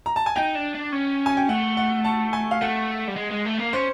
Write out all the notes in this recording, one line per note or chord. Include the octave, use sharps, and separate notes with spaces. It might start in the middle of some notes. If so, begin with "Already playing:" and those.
A#5
A5
G#5
D#4 G5
D4
D4
C#4
G#5
G5
A3 F#5
F#5
A5
G#5
F5
A3 F#5
G3
G#3
G#3
A3
A#3
C#4 C5